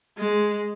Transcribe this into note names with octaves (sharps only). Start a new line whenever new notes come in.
G#3